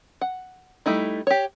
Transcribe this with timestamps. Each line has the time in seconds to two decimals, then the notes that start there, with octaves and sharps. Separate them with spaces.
0.21 F#5
0.86 G3 A3 D#4 E4
1.27 G4 C#5